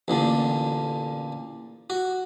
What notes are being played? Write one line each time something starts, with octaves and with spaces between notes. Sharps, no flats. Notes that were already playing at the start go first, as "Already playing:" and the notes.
A1 A#2 D3
F#4